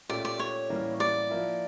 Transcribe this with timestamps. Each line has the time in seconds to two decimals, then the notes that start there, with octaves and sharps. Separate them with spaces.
0.09 A#2 A3 C#4 G4 D5
0.25 D5
0.39 C#5
0.70 A2 E3 G3 A#3 C#4
1.00 D5
1.30 F3 A#3 E4